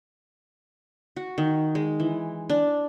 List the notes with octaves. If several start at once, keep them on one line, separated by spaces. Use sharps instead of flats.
F#4
D#3
G#3
E3
D4